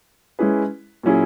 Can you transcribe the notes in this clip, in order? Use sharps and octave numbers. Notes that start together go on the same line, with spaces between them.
G#3 C#4 E4 G#4 B4
A#2 F#3 C#4 E4 G#4